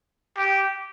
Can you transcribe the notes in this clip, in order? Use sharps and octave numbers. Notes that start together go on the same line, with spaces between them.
G4